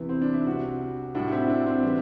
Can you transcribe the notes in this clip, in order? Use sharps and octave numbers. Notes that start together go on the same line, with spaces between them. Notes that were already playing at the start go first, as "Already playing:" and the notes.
Already playing: E2 C3 E3
C4
D4
E4
C2 C3 G3 D4 F#4
A2 G3 D4 F#4
C4 E4
D4
C4
E3 G3